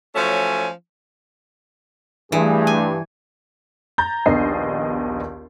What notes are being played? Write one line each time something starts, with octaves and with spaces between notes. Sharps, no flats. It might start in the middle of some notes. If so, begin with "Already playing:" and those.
F3 F#3 A3 C#4 G#5
G2 E3 A3 G#4
G#5
A#5 G6 A6
A#1 D#2 B3 D4 D#5 C7